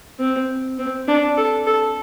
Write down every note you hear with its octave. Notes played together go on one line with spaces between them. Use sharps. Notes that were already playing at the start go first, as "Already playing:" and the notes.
C4
C4
D4
A4
A4